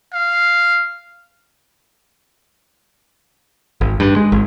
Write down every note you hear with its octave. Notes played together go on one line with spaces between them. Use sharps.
F5
G#1
G2
G#3
G#1